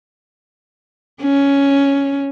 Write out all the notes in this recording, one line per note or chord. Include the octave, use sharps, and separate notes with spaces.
C#4